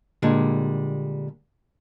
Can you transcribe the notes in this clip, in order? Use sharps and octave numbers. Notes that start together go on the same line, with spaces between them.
A#2 D3 G3 G#3